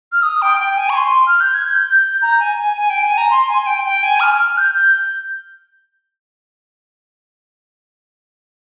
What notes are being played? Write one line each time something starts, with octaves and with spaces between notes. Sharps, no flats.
F6
D#6
G5
G5
G#5
C#6
C6
F6
G6
G#6
G6
A#5
G#5
G#5
G#5
G5
G#5
A#5
C6
G#5
G#5
G5
G5
G#5
F6
F6
G6
G6